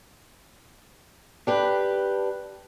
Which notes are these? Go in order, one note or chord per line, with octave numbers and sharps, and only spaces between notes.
D4 G4 B4